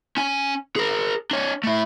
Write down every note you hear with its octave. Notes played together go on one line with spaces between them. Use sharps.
C#4 G#5
G#4 A#4
D4 C#5
A3 E4